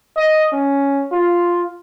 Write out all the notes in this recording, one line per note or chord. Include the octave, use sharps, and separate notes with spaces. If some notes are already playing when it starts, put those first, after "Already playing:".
D#5
C#4
F4